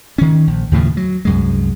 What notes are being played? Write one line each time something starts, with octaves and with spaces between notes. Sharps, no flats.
D#3 C#4
A#1
D#2 A2 C#3 F3
F#3
C2 F#2 G#3